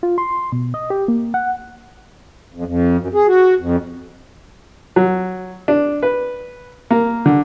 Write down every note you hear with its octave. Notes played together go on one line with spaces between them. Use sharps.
F4
C6
B2
D#5
G4
A#3
F#5
F2
F2
F#2
G#4
F#4
F2
F#3
D4
B4
A#3
D3